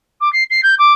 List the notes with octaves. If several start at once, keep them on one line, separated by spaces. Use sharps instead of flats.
D6
C7
C7
G6
D6